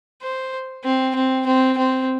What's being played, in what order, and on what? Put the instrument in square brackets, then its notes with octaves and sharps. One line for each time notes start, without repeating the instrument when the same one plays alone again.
[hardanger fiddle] C5
C4
C4
C4
C4